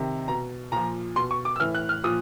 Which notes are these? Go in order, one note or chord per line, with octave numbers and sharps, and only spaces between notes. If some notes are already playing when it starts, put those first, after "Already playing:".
Already playing: C3 D#3
B2 A#5
A#2 F3 A#5
B2 C6
C#6
D6
E6
A2 E3 F6
F#6
F6
A#2 F3 D#6